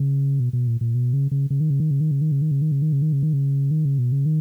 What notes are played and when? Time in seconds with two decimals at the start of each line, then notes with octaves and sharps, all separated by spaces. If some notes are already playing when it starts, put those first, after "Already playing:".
Already playing: C#3
0.40 B2
0.53 B2
0.67 A#2
0.81 A#2
0.95 B2
1.13 C#3
1.31 C#3
1.50 C#3
1.60 D#3
1.70 C#3
1.80 D#3
1.91 C#3
2.01 D#3
2.11 C#3
2.21 D#3
2.32 C#3
2.42 D#3
2.51 C#3
2.62 D#3
2.72 C#3
2.82 D#3
2.93 C#3
3.02 D#3
3.13 C#3
3.23 D#3
3.33 C#3
3.71 D#3
3.85 C#3
3.98 B2
4.12 C#3
4.26 D#3